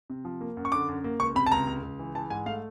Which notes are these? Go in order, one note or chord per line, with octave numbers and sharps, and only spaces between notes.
C3
F3
A#3
F#2
C#6
D3 D6
F#2
A#3
C#2 C#6
C3 B5
A5
C#2 A#5
C#2
C#2
E3
E3 A5
G#2 G#5
A3 F5